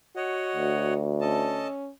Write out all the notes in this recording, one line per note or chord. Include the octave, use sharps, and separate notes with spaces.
F#4 C#5 D#5 F#5
D2
C#4 A4 D#5 A5